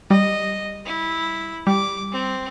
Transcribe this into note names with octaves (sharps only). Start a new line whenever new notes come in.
G3 D#5
E4
G3 D6
C4